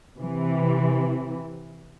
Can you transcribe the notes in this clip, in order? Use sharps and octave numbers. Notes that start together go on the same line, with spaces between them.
C3 E3